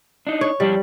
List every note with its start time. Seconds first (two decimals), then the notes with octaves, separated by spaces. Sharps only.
0.27 D4 D#4
0.41 C#5
0.60 F2 G3 D5 A5